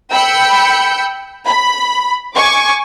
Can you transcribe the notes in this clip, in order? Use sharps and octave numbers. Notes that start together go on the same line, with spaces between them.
G5 B5 E6 G6 C#7
B5
G#5 C#6 D6